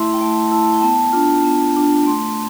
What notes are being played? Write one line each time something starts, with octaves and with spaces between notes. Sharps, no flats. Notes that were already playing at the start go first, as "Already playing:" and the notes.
Already playing: A3 E4 E5 C6
G5
A3 A5
E4 A5
G5
B3 A5
D4 F4
B3
D4 F4
A3 C6